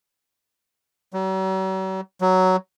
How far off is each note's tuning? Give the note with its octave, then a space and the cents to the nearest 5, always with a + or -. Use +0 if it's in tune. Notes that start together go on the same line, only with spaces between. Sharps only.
F#3 +45
F#3 +10